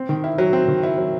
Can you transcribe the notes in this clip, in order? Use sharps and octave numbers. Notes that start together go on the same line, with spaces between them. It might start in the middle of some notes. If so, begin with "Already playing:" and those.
Already playing: C4
D#3
E4
F#3
C4
D#3
E4
F#3